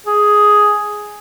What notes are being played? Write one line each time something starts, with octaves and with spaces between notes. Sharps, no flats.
G#4